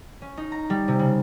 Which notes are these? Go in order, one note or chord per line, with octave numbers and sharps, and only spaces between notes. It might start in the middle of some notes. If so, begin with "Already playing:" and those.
C#4
D#4
A#5
G3
C3
C#3